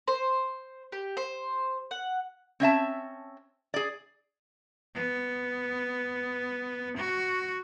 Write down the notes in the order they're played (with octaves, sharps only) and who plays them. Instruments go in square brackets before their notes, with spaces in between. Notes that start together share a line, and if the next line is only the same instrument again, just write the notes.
[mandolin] C5
G4
C5
F#5
[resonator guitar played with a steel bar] C4 C#4 E5 A5
G#4 D5
[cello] B3
F#4